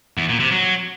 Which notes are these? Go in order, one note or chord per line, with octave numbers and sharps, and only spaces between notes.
E2
A#2
C3
F#3